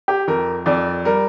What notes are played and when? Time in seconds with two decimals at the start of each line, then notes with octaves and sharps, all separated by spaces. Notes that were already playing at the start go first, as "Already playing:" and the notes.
0.08 G4
0.27 F2 A#4
0.66 F2 D5
1.05 G3 A#4